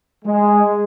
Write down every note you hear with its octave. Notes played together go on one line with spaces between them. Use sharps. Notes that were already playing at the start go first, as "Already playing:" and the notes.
G#3